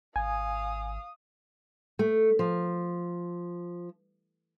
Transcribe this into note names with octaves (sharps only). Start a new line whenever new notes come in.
G#1 F5 G#5 D#6
A3
F3